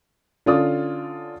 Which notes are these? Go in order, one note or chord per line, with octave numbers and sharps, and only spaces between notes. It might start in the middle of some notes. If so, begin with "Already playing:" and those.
D3 C#4 F4 D5 D#6